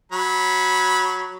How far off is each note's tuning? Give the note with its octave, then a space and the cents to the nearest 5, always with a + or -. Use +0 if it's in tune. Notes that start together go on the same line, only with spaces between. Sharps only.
F#3 +0 B5 -15